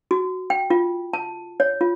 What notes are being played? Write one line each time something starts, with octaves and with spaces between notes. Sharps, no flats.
F#4
G5
F4
A5
C#5
F4